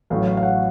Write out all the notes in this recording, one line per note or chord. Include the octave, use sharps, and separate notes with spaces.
A1 A2 F#3 F5
F5
F5
F#5